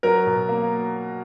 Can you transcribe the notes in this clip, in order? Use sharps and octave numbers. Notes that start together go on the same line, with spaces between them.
F#3 A#4
B2
A#3